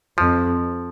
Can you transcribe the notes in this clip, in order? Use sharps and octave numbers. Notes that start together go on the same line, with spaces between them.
F2 F3